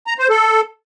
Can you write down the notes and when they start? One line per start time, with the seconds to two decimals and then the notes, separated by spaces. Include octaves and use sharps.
0.07 A#5
0.18 C5
0.29 A4